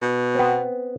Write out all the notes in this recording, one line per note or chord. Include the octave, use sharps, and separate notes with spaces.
B2
B3 C4